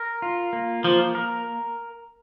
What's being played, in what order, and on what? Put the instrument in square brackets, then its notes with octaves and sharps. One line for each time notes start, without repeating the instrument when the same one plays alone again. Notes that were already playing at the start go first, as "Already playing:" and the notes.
Already playing: [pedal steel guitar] A#4
F4
A#3
[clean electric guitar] F3 [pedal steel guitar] A#3
[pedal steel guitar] A#4